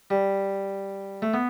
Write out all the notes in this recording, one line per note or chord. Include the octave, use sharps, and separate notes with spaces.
G3
A3
B3